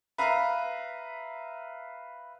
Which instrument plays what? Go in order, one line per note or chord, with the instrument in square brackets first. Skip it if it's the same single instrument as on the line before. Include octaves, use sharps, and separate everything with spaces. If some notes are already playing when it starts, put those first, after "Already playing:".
[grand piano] B4 E5 F5 A#5